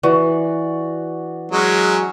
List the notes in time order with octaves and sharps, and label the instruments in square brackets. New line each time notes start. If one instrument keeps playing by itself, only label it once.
[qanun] E3 [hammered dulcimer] F#4 D5
[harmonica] F#3 G#3 C#4